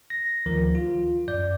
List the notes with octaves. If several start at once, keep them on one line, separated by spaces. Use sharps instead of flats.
A#6
D2 D#3 F3 A#4
F4
F#2 D5 G6